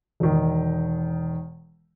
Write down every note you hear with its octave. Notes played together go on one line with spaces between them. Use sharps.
E1 D#3